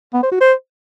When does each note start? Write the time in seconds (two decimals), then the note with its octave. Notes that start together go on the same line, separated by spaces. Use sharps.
0.14 B3
0.23 C5
0.32 F#4
0.41 C5